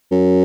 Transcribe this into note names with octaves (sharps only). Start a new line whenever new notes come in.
F#2